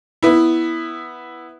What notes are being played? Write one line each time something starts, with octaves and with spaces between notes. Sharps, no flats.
B3 E4